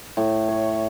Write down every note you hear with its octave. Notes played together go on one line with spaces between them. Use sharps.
A2
C#5